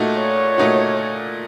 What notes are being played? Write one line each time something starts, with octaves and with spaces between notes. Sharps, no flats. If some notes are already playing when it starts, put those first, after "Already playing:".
Already playing: A#2 A3 D#4 F#4
C#5
A#2 A3 D#4 F#4